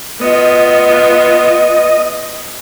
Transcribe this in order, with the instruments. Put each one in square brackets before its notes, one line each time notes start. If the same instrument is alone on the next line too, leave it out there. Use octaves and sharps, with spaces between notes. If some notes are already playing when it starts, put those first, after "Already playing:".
[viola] B3 F4 [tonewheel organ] D#5